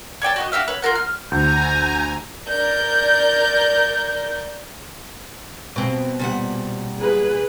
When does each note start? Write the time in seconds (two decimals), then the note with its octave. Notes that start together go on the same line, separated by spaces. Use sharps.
0.22 C#5 D5 G5 A5
0.36 F#4 G4 D#5
0.52 F#4 G4 E5 F5
0.68 B4 C#5
0.82 F4 G4 A#4 F#5
0.95 F6
1.32 D2 G#5 A#5 G6
2.48 A#4 D5 G6
5.76 B2 C4
6.19 A#2 G3 F#5
7.00 G#4 B4